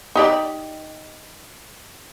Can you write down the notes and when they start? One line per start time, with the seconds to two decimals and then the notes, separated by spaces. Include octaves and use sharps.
0.16 D#4 G4 D5